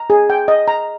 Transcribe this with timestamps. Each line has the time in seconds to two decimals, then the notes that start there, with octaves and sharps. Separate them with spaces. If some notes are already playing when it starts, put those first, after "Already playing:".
Already playing: A#5
0.10 G#4
0.30 G5
0.48 D#5
0.68 A#5